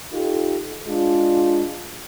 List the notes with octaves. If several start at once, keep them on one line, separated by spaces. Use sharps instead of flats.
D#4 F4 G4 A4
G#3 D4 F4